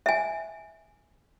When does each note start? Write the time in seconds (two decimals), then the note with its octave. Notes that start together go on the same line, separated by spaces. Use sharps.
0.06 E5 G#5